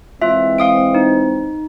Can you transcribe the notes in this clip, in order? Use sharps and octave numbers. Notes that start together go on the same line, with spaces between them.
E3 G#3 C4 F4 E5
F5 D#6 D7
D#4